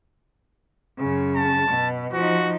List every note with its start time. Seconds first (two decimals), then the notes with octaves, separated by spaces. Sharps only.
0.98 F#2 C#3
1.36 A5
1.70 B2
2.14 F3 D#4 F#4